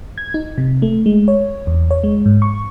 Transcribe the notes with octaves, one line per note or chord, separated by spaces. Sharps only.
G#6
D#4
C3
A3
G#3
C#5
E2
C#5
G#3
G#2
C#6